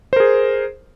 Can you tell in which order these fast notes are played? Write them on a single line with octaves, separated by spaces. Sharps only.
C5 A#4 G#4